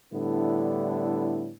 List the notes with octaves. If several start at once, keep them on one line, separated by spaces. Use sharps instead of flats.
A2 D3 G3 B3 D4 E4